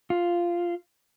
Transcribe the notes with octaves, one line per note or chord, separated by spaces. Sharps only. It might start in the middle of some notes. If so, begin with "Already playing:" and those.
F4